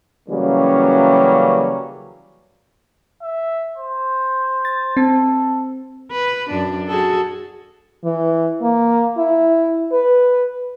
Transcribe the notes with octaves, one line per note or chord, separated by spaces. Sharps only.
C#3 E3 F#3 G3 A#3 C#4
E5
C5
A6
C4 A4
B4
F#2 D4
F#4 G#4 A4
E3
A#3
E4
B4